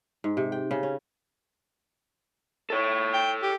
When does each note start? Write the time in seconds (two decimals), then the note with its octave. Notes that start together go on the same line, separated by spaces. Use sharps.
0.24 G#2
0.37 C3
0.52 G5
0.71 C#3
0.83 C#4
2.70 A4 C#5
3.14 G5
3.43 G4